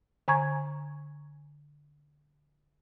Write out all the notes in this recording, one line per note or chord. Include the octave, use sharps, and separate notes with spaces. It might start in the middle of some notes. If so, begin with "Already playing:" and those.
D3 G#5 A#5 C#6 G#6